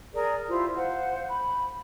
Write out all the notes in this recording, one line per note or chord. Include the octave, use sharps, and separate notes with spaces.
G#4 A#4 D5
E4 F4 G4 C5
C5 F5 F#5
B5